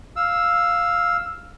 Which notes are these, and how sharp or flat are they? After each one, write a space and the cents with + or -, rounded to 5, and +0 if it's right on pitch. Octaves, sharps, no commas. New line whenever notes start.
F5 +0 E6 +0